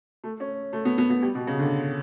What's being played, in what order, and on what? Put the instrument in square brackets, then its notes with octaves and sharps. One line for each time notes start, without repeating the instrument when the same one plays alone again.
[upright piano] A3
C#4
A3
B3
B3
B3
G3
B2
C#3
D3